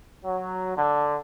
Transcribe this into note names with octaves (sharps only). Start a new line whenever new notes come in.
F#3
D3